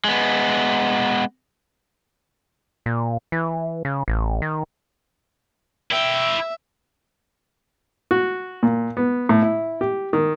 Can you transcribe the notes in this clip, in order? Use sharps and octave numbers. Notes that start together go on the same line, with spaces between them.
G#3 B3
A#2
E3
C#3
A1
D#3
E4 E5 G5
F#4
A#2
B3
A2
E4
G4
D#3